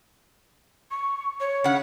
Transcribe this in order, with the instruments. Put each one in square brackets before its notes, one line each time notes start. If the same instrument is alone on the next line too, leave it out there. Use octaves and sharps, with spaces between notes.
[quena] C#6
C#5
[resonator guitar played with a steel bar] C#3 F#5